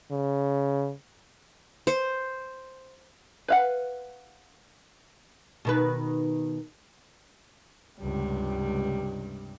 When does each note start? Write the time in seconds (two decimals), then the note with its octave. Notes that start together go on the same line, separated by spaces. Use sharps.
0.11 C#3
1.87 C5
3.48 B4 F5 F#5
5.65 B2 D#3 B4
7.99 C#2 G2 C3 G3